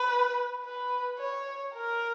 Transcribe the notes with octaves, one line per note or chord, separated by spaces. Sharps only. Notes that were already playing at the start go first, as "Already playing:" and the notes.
Already playing: B4
B4
C#5
A#4